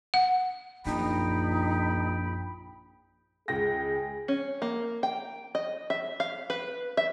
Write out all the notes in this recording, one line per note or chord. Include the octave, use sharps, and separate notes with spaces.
F#5
A#1 F#2 D#4 E4 G5 B5
C#2 G#4 G5 A#6
C#4
A#3
G5
D#5
E5
F5
B4
E5